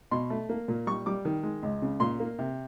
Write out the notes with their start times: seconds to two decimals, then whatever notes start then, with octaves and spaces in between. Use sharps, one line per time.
0.11 B2 C6
0.30 A3
0.49 A#3
0.68 A#2
0.87 G3 C#6
1.06 G3 D6
1.25 D#3
1.43 G#3
1.63 C#2
1.82 C#3
2.00 A#2 C6
2.20 A#3
2.39 C3